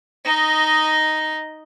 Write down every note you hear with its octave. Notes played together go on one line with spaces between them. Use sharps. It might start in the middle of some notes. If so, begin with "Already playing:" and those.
D#4 D#5